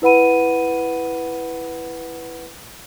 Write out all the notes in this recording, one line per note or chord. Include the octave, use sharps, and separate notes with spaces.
E4 B4 F#5 B5 D#7